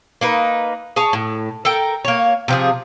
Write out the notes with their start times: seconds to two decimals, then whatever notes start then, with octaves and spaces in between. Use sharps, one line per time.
0.21 A#3 D#4 B4
0.96 G#4 C#5 A5
1.13 A2
1.65 A4 A#4 G5
2.05 A#3 C#5
2.48 C3 F3 G#4